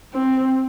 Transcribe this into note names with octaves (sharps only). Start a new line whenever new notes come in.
C4